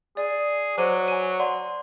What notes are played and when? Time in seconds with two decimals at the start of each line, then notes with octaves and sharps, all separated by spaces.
0.17 G#4 D5
0.78 F#3 C5 D6 D#7
1.08 G#5 D#7
1.40 D5 F#5 G5 C6